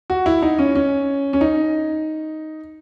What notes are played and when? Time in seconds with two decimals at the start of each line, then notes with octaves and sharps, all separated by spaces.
0.10 F#4
0.26 E4
0.42 D#4
0.59 C#4
0.75 C#4
1.33 C#4
1.41 D#4